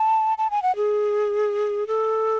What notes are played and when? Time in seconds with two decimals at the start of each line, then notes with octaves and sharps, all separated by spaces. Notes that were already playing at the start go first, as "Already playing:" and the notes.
Already playing: A5
0.38 A5
0.51 G#5
0.62 F#5
0.76 G#4
1.87 A4